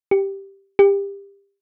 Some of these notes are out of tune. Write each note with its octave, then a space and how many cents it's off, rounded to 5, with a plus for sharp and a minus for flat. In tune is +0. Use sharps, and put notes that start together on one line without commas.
G4 +0
G4 +25